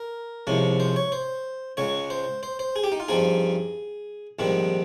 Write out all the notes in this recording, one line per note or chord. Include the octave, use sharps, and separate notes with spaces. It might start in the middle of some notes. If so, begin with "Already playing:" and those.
Already playing: A#4
C2 C3 F3 G#3 C#4
C5
C#5
C5
C#2 C#3 G#3 C#5
C5
C5
C5
G#4
G4
D#4
F4
G2 F3 C4 D#4 G#4
A#1 G#2 D#3 G3 C4